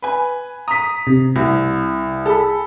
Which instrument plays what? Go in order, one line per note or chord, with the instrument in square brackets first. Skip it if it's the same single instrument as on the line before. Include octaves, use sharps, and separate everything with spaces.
[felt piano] B4 G#5
[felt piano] A#5 B6 [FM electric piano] D#6
[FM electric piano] C3
[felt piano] C2
[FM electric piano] G#4 B5 [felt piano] A4